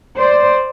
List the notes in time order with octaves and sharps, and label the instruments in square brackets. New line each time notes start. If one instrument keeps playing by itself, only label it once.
[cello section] C5 D5